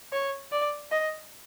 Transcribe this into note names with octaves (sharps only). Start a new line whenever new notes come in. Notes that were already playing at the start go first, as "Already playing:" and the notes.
C#5
D5
D#5